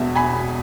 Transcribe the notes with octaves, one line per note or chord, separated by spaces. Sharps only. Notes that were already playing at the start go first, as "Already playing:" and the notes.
Already playing: E1 E2 B2 E5
G#5 B5